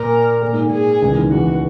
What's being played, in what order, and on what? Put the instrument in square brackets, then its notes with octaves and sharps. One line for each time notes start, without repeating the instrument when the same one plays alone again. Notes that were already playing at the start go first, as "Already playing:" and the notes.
Already playing: [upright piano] A#2 [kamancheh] A#4
[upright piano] A#2
G#2
A#2
[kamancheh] G#4
[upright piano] C#2 C#3
E3
D#2 D#3
[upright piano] E2 E3 [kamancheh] F#4